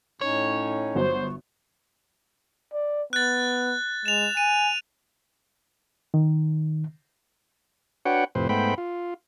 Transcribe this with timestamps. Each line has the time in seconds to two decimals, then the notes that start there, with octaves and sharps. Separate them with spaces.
0.21 A2 C#4 D#4 C#5
0.95 G1 F#3 B3 C5
2.73 D5
3.13 B3 F#6 A6
4.06 G#3 E7 F7
4.37 G#5 D#7
6.14 D#3
8.05 D4 F#4 B4 C#5 F#5 G5
8.35 F2 A2 C3 B4 C5
8.49 G#2 A3 B3 C5 G5 B5
8.78 F4